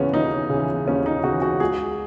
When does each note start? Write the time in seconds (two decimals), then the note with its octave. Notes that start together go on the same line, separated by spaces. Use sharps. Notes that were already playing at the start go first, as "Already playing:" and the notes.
Already playing: D#2 C#3 E3 B3 C#4
0.13 D#2 D#4
0.50 C#3 E3
0.86 D#2 C#4
1.06 D#4
1.23 C#3 E3 F#4
1.42 F#4
1.60 C#2 G#4